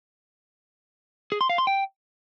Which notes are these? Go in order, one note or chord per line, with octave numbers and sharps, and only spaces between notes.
G#4
C6
F5
C6
G5